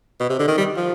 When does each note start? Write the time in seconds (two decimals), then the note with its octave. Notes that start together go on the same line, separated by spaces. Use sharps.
0.20 B2
0.30 C3
0.39 D3
0.48 D#3
0.58 G3
0.77 F3